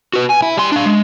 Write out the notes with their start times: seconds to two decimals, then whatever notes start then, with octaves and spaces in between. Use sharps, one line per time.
0.13 F#4 B4
0.30 G#5
0.42 E4
0.57 G3 C6
0.72 D4 F5
0.86 G#3